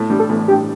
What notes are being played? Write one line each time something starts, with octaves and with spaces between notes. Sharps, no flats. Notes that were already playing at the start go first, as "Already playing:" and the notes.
Already playing: A2 A3
G2 G3
A4
A1 A2
G2 G4